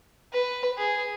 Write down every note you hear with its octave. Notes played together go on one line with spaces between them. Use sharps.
B4
G#4